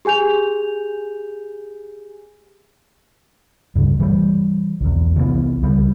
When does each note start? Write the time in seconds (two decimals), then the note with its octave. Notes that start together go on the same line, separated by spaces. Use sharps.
0.05 G4 G#4 G#5 G6 F7
3.75 C#2 G2
4.00 E3 G3
4.81 B1 E2
5.16 C2 E3 F#3 B3
5.63 C#2 G3